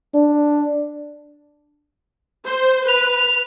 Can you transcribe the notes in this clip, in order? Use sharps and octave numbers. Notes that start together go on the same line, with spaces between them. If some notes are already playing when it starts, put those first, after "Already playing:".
D4
C5
B4 F7